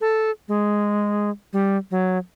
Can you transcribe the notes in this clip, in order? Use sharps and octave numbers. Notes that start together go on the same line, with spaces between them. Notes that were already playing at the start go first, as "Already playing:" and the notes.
A4
G#3
G3
F#3